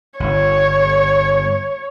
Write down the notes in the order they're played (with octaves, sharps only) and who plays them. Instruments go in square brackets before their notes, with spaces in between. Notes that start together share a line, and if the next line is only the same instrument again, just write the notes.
[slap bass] G1 [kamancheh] C#5